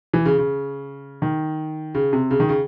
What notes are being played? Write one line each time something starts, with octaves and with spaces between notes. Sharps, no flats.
E3
C#3
C#3
D#3
C#3
C3
C#3
D#3
C#3